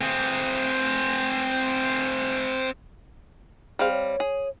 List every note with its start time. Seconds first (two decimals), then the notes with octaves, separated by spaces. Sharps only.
0.01 C4 G#4
3.79 G3 C4 G#4 F5
3.91 C#5
4.20 G#4